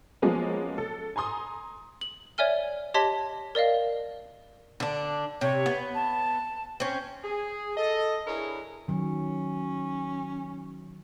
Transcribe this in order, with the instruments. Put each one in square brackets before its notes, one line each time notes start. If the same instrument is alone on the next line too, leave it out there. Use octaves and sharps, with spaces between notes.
[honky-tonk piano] F3 F#3 G#3 A#3 B3 C#4
A4
G#5 A#5 C6 D#6
[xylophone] F#7
C#5 D5 E5 G#5 F6 G7
G4 C#5 D#5 A5 C6 B6
A#4 D5 D#5 F5
[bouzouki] D3 D4
[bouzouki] C3 [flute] C#5
[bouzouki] B3
[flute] A5
[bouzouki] C4 C#4
[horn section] G#4
A4 D#5
D4 E4 G#4 A#4 B4 C#5
[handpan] D#3 F#3 [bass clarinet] C#4